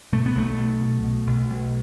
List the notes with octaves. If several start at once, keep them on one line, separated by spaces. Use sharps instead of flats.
B2 A3
B3
B1 A3
B1
B2
B2
B1
B1